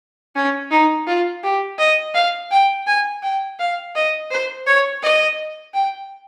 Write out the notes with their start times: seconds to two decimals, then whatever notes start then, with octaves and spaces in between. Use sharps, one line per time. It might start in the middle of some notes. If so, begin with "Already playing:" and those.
0.35 C#4
0.71 D#4
1.07 F4
1.43 G4
1.79 D#5
2.15 F5
2.51 G5
2.87 G#5
3.22 G5
3.59 F5
3.95 D#5
4.31 C5
4.67 C#5
5.03 D#5
5.74 G5